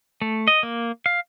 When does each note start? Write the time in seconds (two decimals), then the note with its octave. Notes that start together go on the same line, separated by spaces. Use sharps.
0.22 A3
0.48 D#5
0.63 A#3
1.06 F5